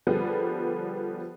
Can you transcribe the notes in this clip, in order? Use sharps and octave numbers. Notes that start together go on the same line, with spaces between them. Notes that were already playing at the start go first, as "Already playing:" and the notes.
D3 F3 G3 B3 G#4